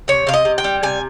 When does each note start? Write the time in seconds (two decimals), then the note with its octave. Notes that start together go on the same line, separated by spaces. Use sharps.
0.08 C3 C#5
0.27 C3 F5
0.34 D#5
0.45 C3
0.58 G5
0.64 G3
0.83 C3 G#5